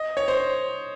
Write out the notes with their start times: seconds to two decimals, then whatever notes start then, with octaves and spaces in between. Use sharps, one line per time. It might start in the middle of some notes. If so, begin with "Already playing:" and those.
Already playing: D#5
0.17 C#5
0.28 C5